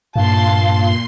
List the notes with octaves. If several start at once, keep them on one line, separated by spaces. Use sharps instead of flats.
G2 A#2 F5 A5 C6